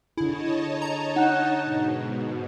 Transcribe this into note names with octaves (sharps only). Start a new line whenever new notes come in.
D3 E4 G#4 C#5 D#5 A5
A#5
D#4 F#5 F#6 E7
G#2 B2